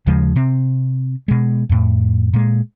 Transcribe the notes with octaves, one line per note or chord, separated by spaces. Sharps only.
D#2 C#3 F3 G#3
C3 C4
B2 G#3
F2 A2
A#2 G#3